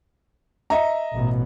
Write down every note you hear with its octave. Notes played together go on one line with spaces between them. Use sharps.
D#5 E5 A#5
A1 B2